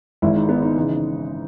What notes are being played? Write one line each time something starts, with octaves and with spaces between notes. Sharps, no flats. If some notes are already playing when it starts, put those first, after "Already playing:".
G#1 G#2 D#3 E4
D#4
B3
D#4
C#3 E3